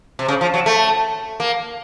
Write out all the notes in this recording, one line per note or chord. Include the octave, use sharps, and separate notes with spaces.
C3
C#3
F3
F#3
A3
A#3